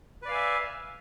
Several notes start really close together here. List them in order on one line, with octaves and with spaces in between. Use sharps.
B4 D5 F5 G#5 E5